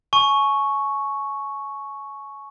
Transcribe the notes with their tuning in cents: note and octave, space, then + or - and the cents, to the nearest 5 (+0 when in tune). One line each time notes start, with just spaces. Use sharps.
G#5 +35 C#6 +0